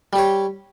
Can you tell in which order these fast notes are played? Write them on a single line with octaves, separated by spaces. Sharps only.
G3 G4 C#5